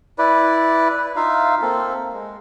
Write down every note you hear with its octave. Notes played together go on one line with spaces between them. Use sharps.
E4 B4 D5
B4
D#4 F4 E5 F5
A#3 C4 A4
G#3